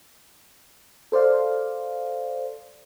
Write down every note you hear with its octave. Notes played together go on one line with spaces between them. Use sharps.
A4 C5 D5 F5